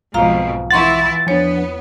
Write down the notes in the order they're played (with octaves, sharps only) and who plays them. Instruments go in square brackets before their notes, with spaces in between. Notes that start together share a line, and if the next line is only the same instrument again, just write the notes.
[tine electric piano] B1 [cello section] F2 G#2 B2 [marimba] F4 F5 A#5
[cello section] E3 E4 [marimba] F#5 C6 C#6 [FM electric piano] A6
[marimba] E2 C#5 [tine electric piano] F3 D4 [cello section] B3